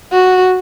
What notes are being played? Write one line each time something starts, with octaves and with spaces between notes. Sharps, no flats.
F#4